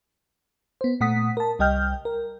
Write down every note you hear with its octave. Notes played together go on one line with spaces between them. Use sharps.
B3 C5
A#2 A3 F#5 D#6 B6
A#4 A5
C2 G3 D#5 G5 F6 G6
A#4